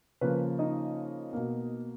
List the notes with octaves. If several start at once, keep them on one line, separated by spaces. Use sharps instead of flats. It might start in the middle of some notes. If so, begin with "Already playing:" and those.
C#3 F3 A#3 B4
D#4 D#5
B2 A#3